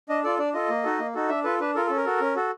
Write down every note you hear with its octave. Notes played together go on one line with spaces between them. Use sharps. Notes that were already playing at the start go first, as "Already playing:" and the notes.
D4 D#5
F4 A4 D5
D4 D5
F4 A4 D#5
A#3
D#4 F#4 A4
A#3
D#4 F#4 A4
D4 E5
F4 A4 B4
D4 B4
F4 A4 A#4
C#4 A4
A#4
F#4 A4
C#4
F#4 A4